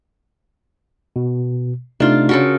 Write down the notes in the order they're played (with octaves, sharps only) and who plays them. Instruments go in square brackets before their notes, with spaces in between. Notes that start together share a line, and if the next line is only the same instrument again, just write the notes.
[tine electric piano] B2
[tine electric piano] C3 A3 D#4 [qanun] D4 F4
[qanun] C#3 A4 A#4 [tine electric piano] F#4